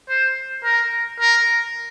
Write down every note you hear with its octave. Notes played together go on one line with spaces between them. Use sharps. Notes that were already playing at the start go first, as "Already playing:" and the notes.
C5
A#4
A#4